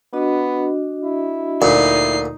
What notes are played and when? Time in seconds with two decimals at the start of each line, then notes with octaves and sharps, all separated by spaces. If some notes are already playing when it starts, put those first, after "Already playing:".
0.13 B3 D4 F#4 D#5
1.04 E4
1.62 D2 A#2 D#4 C7